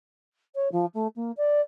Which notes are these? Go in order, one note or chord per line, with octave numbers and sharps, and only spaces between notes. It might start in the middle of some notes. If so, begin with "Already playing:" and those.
C#5
F3
A3
A#3
D5